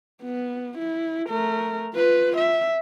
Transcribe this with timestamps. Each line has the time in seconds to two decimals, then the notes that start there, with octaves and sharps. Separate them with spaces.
0.23 B3
0.78 E4
1.29 A3 A#4
1.94 F4 B4
2.37 E5